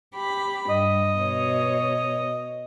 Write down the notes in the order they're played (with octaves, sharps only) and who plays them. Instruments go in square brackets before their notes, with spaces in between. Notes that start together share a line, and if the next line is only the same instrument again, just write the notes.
[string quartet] G4 B5
[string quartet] G2 [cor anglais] D#5
[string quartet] B2 C#5